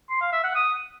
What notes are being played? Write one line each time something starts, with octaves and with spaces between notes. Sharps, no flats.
C6
F5
E5
F#5
D#6